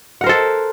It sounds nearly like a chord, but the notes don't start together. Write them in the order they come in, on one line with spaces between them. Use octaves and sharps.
F#5 A#4 C5 A4